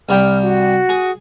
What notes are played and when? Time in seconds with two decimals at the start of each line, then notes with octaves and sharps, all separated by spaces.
0.09 C2 G3 G5 F6
0.42 F#4
0.89 G#4